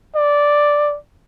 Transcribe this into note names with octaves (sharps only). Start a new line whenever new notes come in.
D5